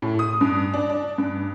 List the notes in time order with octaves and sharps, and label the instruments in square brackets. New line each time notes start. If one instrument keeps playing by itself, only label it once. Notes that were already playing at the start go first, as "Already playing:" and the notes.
[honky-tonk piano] A2
D#6
G2
D4
D4
G2